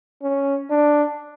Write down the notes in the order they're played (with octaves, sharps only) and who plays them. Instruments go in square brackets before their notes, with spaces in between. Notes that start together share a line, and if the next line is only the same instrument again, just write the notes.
[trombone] C#4
D4